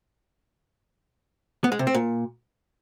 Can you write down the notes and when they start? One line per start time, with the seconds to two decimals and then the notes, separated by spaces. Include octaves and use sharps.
1.64 B3
1.72 G#3
1.79 C3
1.87 C4
1.94 A#2